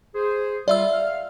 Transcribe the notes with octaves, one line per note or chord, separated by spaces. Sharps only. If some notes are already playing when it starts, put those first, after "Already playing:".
G#4 C5
G3 F4 D5 E5 E6
F5 F6